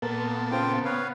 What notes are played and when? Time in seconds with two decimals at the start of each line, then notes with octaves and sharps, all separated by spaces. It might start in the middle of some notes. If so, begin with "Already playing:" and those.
0.02 A#2 A#3 B3 A4
0.51 C#3 C4 F4 G5
0.85 B4 C#5 F5